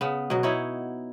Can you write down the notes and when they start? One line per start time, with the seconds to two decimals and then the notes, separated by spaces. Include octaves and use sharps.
0.01 C#3 B3
0.30 B2 F#3
0.43 D#4 E4 C#5